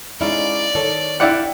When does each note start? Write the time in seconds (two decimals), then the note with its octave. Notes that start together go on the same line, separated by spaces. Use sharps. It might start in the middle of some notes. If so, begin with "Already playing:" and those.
0.21 G#3 C#4 D#4 E4 D5 F5
0.75 D#3 A4 C#5
1.20 E4 G4 D5 F5 F#5